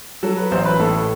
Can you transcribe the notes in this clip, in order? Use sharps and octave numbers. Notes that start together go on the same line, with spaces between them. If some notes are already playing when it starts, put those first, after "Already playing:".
F#3 A4
B4
A1 C5
B4
A2 A4